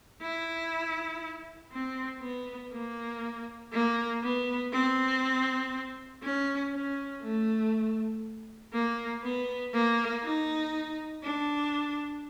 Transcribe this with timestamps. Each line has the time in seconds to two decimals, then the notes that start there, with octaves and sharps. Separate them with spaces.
0.22 E4
1.72 C4
2.22 B3
2.72 A#3
3.73 A#3
4.22 B3
4.73 C4
6.23 C#4
6.73 C#4
7.22 A3
8.73 A#3
9.23 B3
9.74 A#3
10.24 D#4
11.23 D4